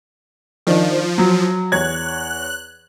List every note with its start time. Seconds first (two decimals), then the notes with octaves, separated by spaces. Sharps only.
0.67 D#3 F3 D4
1.18 F#3
1.72 E2 C#5 F#6 G#6